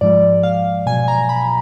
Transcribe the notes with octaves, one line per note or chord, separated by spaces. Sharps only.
G#2 F3 G#3 D5
F5
B2 F#3 G#5
A#5
B5